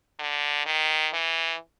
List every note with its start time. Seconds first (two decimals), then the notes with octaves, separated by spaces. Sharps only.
0.19 D3
0.66 D#3
1.13 E3